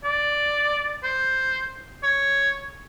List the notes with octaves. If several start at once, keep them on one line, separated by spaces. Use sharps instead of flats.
D5
C5
C#5